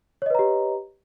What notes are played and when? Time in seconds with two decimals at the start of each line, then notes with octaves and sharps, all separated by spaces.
0.22 C#5
0.26 D#5
0.30 B4
0.35 A#5
0.39 G4